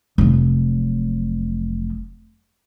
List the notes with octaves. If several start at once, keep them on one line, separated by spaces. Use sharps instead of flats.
F1 F#3